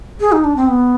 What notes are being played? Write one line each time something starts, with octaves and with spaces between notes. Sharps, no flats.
G#4
D#4
D4
C4
B3